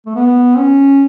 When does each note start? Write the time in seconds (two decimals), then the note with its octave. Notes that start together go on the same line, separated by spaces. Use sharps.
0.06 A3
0.15 B3
0.57 C#4